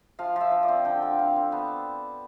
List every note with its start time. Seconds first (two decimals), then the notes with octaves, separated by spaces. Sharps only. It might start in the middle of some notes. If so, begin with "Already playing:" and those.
0.19 F3 F5
0.36 F3 E5
0.51 F3
0.63 D5
0.68 C4
0.85 D3 G5
1.02 D3 F5
1.19 C4 F5
1.36 C4
1.52 B3 A5